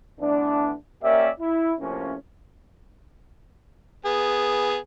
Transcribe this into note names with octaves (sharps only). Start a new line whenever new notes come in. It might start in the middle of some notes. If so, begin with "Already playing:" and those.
D3 E3 A3 B3 D4
A#3 C#4 G4 A#4 D5 E5
E4
A2 C3 F3 A#3 C#4
B3 G#4